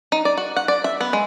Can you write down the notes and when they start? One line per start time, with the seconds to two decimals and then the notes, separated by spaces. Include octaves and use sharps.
0.12 D#4
0.25 D5
0.38 F#4
0.57 F#5
0.68 D5
0.84 E5
1.01 B3
1.13 G#3